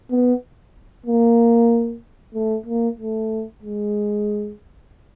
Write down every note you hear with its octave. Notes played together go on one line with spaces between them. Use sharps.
B3
A#3
A3
A#3
A3
G#3